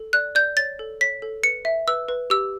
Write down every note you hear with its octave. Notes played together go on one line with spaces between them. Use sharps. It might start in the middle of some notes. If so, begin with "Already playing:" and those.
Already playing: A4
D5 F#6
D5 G6
C#5 A6
A4
C#5 B6
A4
B4 C#7
E5
B4 E6
B4
G4 E6